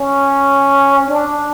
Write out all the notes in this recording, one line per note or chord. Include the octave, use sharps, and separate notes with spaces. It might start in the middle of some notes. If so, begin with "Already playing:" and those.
Already playing: C#4
D4